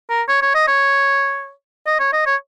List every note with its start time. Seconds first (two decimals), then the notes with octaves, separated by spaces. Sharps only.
0.10 A#4
0.28 C#5
0.42 C#5
0.55 D#5
0.68 C#5
1.86 D#5
2.00 C#5
2.13 D#5
2.26 C#5